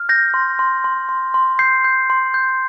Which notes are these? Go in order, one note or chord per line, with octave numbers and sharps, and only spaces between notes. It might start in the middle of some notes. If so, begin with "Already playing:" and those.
Already playing: F6
G6 A#6
C6
C6
C6
C6
C6
G6 C7
G6
C6
G6